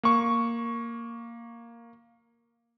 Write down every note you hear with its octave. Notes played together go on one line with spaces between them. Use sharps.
A#3 C#6